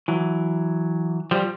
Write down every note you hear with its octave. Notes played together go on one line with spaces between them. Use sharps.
E3 F#3
F3 G3